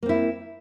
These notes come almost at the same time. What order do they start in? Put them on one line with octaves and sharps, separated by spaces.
A#3 C4 E4